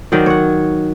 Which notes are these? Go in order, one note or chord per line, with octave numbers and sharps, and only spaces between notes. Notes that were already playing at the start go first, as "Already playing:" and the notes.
D#3 F#3 C5 D5
C#5 F#5